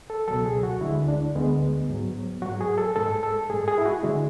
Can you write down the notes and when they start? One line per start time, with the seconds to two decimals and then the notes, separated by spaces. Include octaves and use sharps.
0.10 A4
0.28 C#2 B2 F#3 A4
0.45 G#4
0.63 F#4
0.81 D2 D3 G#3 E4
1.08 D4
1.36 D2 D3 G#3 B3
1.89 G#2 F#3
2.42 G#2 F#3 F#4
2.61 G#4
2.78 A4
2.96 G#2 G#3 A4
3.23 A4
3.50 G#2 G#3 G#4
3.68 G#4
3.78 E4
3.85 F#4
4.03 D3 G#3 E4